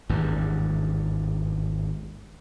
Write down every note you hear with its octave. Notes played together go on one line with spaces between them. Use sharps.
G#1 E2 G2